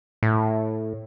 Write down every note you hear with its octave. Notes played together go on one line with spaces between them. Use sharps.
A2